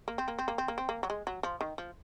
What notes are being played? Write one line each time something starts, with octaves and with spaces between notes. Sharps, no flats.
A#3
C4
A#3
C4
A#3
C4
A#3
C4
A#3
F#3
G#3
F#3
F3
D#3
F3